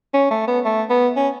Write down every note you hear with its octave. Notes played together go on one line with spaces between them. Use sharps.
C#4
A3
B3
A3
B3
C#4